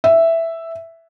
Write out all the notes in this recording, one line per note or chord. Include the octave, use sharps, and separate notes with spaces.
E5